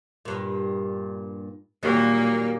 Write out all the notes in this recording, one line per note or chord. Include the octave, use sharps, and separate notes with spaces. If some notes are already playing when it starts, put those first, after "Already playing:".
G2 A#2
A#2 D#3 F#3 G3 A#3